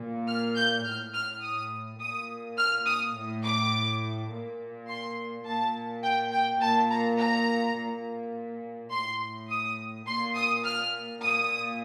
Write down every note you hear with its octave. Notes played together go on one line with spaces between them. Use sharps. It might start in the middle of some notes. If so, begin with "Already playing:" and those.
Already playing: A#2
F6
G6
A2 F6
F6
D#6
A#2 D#6
F6
D#6
A2
D6
A#2
C6
A#2 A5
G5
G5
A#2 A5
A#5
A#5
A#2
A2 C6
D#6
A#2 C6
D#6
F6
A#2 D#6